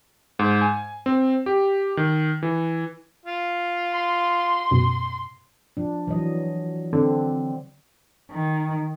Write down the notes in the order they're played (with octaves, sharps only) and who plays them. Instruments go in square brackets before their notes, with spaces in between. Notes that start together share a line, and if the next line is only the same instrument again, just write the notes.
[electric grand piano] G#2
G#5
C4
G4
D#3
E3
[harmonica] F4
[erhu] C6
[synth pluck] F#2 B2
[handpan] F3 D4
E3 F#3 D#5
[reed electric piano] D3 [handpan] C4 D4
[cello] D#3